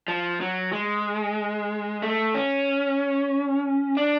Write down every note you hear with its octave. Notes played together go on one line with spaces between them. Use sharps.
F3
F#3
G#3
A3
C#4
D4